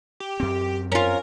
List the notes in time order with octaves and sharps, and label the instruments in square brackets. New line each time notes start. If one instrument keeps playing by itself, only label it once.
[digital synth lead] G4
[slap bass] F#2 C4
[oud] C#4 F4 [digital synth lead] A#4